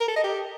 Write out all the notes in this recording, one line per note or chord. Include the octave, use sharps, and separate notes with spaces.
A#4
A4
D#5
G4